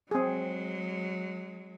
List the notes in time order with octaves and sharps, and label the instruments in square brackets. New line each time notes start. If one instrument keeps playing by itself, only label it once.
[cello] F#3 G#3 [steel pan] C4 G#4